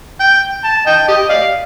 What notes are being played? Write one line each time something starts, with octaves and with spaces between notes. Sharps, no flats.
G5
A5
D#5 G5
G4 D#5
D5 F5